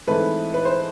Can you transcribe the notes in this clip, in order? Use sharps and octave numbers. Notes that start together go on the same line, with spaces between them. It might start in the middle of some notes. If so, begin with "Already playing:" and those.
G#2 E3 A3 C4 B4
B4
C5